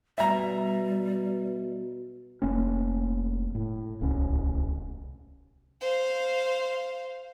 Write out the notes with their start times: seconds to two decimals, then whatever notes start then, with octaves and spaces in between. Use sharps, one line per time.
0.18 B2 G3 E5 A#5
2.42 F1 A#3 C#4
3.55 A2
4.01 D1 C2 C#4
5.81 C5 F5